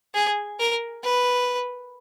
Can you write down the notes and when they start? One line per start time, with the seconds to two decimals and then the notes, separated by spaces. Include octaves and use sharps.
0.15 G#4
0.60 A#4
1.03 B4